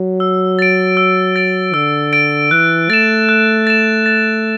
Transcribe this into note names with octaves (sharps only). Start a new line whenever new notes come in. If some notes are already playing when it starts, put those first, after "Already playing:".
Already playing: F#3
E6
A6 D7
E6
A6 D7
D3 E6
A6 D7
E3 F#6
A3 A6 E7
F#6
A6 E7
A6